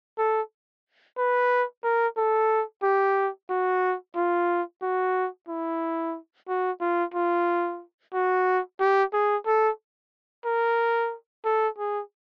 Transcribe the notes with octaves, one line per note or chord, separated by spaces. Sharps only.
A4
B4
A#4
A4
G4
F#4
F4
F#4
E4
F#4
F4
F4
F#4
G4
G#4
A4
A#4
A4
G#4